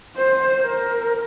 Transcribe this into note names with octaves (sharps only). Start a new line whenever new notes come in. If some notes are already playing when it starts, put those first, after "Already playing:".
C5
A#4